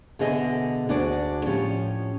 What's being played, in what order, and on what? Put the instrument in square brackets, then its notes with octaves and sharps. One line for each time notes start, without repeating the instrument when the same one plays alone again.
[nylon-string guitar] B2 D3 G#4 D#5 E5
D2 D4 F#4 G#4 D5
A2 F3 C#4 G4